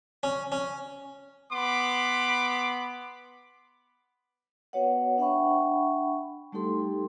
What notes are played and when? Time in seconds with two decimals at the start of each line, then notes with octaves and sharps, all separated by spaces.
0.23 C#4
0.52 C#4
1.52 B3 B5 C6 D6
4.73 B3 F#4 B4 C#5 D#5 F#5
5.18 D4 E5 F#5 G5 B5 C#6
6.52 G3 A3 D#4 G4 A4 C6